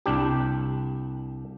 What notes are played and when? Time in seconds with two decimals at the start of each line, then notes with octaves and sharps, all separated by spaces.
0.06 C2 D4 G4